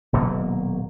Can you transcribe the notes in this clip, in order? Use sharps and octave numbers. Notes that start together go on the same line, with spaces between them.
D#1 B2 F#3 A#3